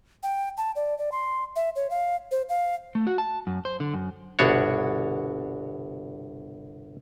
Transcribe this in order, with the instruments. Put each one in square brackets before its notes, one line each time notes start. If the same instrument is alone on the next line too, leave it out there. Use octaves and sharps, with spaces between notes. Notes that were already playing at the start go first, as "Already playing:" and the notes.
[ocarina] G5
A5
D5
D5
C6
E5
C#5
F5
C5
F5
[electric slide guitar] A3
F#4
A5
F#2
C5
D3
F#2
[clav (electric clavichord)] G1 C2 B2 D4 F#4 C#5